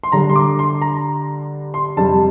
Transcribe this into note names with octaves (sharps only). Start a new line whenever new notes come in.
C6
D3 G3 D4 A#5
C6
D6
C6
A#5
C6
F2 C3 G3 A5